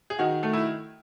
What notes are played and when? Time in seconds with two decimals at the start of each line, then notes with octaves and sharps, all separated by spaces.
0.10 G#4
0.19 D#3 F#4
0.43 A3
0.53 E4